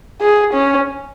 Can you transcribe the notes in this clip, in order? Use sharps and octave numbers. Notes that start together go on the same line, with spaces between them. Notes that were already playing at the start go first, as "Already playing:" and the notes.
G#4
C#4